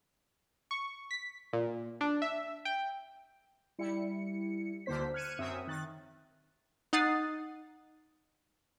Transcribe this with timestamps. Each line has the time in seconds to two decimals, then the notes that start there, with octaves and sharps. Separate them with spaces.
0.71 C#6
1.11 B6
1.53 A#2
2.01 D4
2.22 E5
2.65 G5
3.79 G3 E4 C#7
4.86 D2 D3 A#3 C5 B6
5.14 F6 F#6 G#6 C#7 D#7 E7
5.39 F#2 C4 E5 D#6
5.67 D#3 F#6 A6
6.93 D#4 F#5 D#6 A6 C7